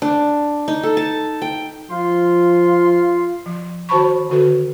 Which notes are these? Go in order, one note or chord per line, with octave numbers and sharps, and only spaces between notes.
D4
D#4
A4
A5
G5
F3 F4 C6
F3
D#3 F#4 C5 A5 B5 C#6
D3 D#3 F#4 A4 B4